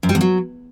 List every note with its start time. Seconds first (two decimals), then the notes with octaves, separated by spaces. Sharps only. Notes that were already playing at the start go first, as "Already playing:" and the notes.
0.03 F#2
0.09 G3
0.15 E2
0.21 F#3